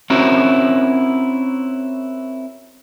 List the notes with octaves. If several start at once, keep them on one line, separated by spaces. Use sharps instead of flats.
C4 C#4 E4 F#4 A#4